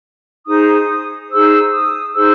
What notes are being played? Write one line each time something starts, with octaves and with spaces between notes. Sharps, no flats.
D#4 G#4 C5 D#6
D#4 G#4 C5 E6
D#6
D#4 G#4 C5 E6